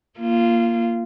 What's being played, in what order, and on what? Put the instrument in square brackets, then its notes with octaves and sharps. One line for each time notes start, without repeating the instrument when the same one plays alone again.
[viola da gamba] A#3 F4